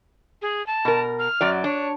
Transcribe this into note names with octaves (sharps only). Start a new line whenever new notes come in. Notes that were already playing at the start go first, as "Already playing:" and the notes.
G#4
A5
B2 A#4
F6
F#2 F#3 D5
D4 C#5